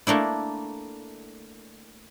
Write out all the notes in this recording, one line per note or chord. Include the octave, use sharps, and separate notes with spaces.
A3 A#3 D4 E4